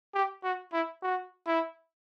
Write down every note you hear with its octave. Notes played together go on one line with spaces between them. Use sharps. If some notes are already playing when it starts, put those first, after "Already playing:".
G4
F#4
E4
F#4
E4